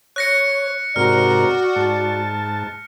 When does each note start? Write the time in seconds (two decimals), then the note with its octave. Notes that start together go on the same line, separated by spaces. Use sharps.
0.16 C#5 F#6 A#6 C#7
0.96 G#2 C3 F#4 A#4 D5 F6
1.76 G#2 A5